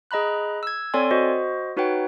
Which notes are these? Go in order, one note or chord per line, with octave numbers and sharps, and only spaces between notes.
G#4 D#5 A#5 B5 F#6
E6 G#6
C4 A4 C#5 D5 G#5 C6
F#4 C5 D#5
D#4 F#4 B4 C#5 F#5 G5